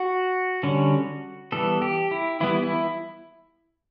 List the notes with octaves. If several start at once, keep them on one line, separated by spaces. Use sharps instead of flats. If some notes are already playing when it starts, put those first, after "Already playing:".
Already playing: F#4
D3 G3 C#4
E3 G3 B3 A4
G4
E4
E3 G3 B3 E4
E4